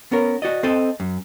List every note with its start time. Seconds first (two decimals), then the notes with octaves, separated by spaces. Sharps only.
0.12 B3 C#4 A#4
0.42 F#4 D5 D#5
0.63 C4 A4 D#5
1.00 F#2